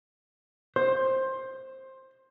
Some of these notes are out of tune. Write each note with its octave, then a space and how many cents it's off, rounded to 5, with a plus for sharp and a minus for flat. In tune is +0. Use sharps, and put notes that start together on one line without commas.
C5 +15